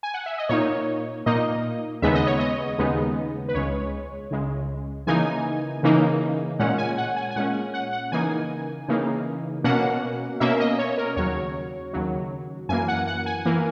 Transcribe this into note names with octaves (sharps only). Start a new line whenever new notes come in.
G#5
F#5
E5
D#5
A#2 A#3 D#4 C#5
A#2 A#3 D#4 D#5
D#2 C#3 G#3 B3 D#4 E5
D#5
C#5
D#5
D#2 C#3 G#3 B3 D#4
B4
C#2 C#3 G#3 C#5
C#2 C#3 G#3
C#3 E3 A#3 D#4 G#5
C#3 E3 A#3 D#4
A#2 G#3 C#4 F#5
G#5
F#5
G#5
G#5
A#2 G#3 C#4 F#5
F#5
F#5
C#3 E3 A#3 D#4 G#5
C#3 E3 A#3 D#4
B2 A#3 C#4 F#5
B2 A#3 C#4 E5
D#5
C#5
A#4
D#2 C#3 F#3 C#5
D#2 C#3 F#3
F#2 E3 A#3 G#5
F#5
F#5
G#5
E3 A#3